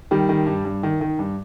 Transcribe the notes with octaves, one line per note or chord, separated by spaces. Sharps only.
D#3 G3
D#3
G2
G2
D#3
D#3
G2